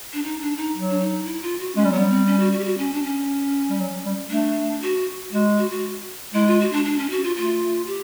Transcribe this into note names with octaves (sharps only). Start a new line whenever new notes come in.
D4
D#4
D4
D#4
F#3
D4
D#4
E4
F4
F#4
G#3 C#4
G3
F#3 B3
G3
C4
C#4
F#4
F#4
G4
F#4
C#4
D4
C#4
G3
F#3
G3
A3 D4
F#4
G#3 F#4
F#4
F#4
G#3 E4
F4
F#4
D4
D4
C#4
F#4
F4
A3 F4
G4